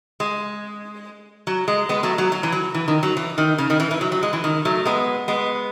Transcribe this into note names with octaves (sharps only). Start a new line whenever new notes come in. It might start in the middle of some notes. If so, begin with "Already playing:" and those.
G#3
F#3
G#3
G#3 B3
F#3 A3
F#3
F#3
E3
F#3
E3
D#3
F#3
E3
D#3
C#3
D#3
E3
E3
F#3
F#3
G#3
E3
D#3
F#3 A3
G#3 B3
G#3 B3